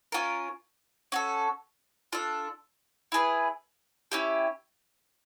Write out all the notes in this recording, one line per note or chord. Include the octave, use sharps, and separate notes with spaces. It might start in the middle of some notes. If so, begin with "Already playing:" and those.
C#4 F4 A#4
C#4 F#4 A4
D4 F4 A4
E4 G#4 B4
C#4 E4 G4